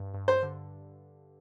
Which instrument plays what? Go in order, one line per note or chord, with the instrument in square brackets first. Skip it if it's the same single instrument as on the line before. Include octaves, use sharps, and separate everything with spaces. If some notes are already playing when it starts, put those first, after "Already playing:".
Already playing: [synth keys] G2
G2
[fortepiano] C5
[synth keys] D3